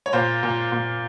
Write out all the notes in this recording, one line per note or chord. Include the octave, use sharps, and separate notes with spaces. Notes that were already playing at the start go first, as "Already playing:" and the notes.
C#5
A#2 C5
A#2
A#2